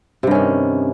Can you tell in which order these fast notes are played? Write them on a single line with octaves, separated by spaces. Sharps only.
C3 G2 C#4 D#3